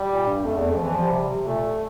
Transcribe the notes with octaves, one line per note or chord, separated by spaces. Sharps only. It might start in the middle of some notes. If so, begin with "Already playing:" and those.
Already playing: G3
A#2
G2
F2 A3
E2
F2
F3
E3
F3 G3
C3
C3
A#2 A3